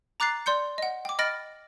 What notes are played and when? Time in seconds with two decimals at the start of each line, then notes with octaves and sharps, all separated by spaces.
0.20 A#5 D6 F#6 A6 C7
0.46 D5 C6 G6 C#7
0.78 D#5 F#5
1.05 G5 D6
1.19 D#5 B5 F6 A6 A#6 D7